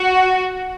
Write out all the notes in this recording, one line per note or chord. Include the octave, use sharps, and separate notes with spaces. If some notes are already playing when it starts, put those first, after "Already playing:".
Already playing: F#4